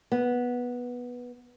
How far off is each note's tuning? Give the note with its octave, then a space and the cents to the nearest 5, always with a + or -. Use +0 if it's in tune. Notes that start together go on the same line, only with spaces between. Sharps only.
B3 -10